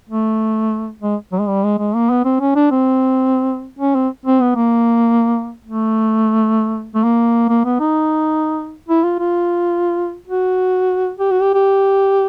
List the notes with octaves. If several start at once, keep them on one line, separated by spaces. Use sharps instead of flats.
A3
G#3
F#3
G#3
G3
G#3
G#3
A#3
B3
C4
C#4
D4
C4
C#4
C4
C4
B3
A#3
A3
A3
A#3
A#3
B3
D#4
E4
F4
F4
F#4
G4
F#4
G4
G4